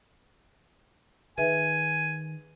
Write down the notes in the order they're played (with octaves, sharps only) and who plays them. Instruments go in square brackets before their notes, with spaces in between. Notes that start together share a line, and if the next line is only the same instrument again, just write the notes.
[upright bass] D#3 [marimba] G#4 B4 E5 [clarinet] G#5